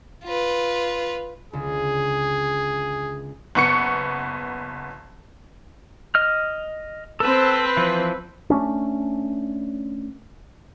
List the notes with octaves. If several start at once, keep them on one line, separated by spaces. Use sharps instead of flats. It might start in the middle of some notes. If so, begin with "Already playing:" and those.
F4 B4
C#2 D3 G#4
F#1 B3 C#6 C#7
D#5 F6
C4 A4 B4 A5
E3 F3
A3 C#4 D4